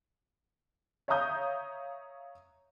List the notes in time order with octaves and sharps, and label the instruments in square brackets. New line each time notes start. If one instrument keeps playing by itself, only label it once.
[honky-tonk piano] C#5 E5 F5 A#5 D#6 G6